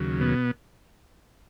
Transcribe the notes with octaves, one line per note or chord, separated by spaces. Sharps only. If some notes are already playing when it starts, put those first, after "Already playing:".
Already playing: D#2 C#3 F#3
B2 B3